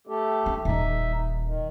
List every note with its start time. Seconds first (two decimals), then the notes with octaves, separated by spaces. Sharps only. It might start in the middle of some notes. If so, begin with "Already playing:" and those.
0.07 A3 G4 A4
0.46 D#4
0.65 D#1 F2 D#4 E5
1.43 D#3